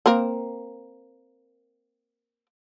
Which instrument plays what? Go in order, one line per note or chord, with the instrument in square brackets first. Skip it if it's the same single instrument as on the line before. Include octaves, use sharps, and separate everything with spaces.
[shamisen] A#3 C4 A#4